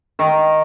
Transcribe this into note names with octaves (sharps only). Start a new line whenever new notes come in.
D#3